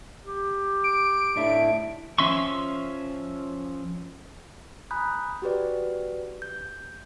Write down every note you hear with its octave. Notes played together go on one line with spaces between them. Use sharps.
G4
D7
A2 D4 E4
F3 C#4 E5 C6 C#6
G#5 A#5 B5 D#6 F#6 G6
F#4 G4 B4 D5
G6